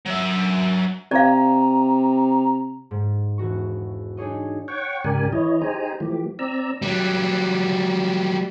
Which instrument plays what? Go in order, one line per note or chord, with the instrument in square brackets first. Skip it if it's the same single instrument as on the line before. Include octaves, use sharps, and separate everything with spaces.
[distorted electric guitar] F#3 E5
[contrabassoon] C3 [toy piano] D5 F5 [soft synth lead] A#5
[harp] G#2
E1 F#4 C#6
D4 D#4 G#4 C#5 D#5
[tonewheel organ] C#5 F#5 G5 C#6
G#2 C#3 G4 A#4 D5 G#5
E3 E4 C#5 D#5
D#4 G4 G#4 C5 G#5 A#5
E3 F3 A3 G4
C4 D5 A#5 E6
[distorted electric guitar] F#3 G3